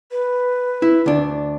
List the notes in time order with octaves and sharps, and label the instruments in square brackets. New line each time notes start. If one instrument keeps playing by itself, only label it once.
[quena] B4
[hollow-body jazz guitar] E4
D2 D4